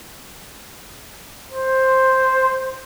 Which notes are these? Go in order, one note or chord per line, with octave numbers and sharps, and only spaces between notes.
C5